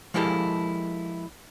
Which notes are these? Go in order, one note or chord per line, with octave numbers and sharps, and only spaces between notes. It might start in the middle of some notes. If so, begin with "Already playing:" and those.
F3 G#3 A#3 E4 G4 A4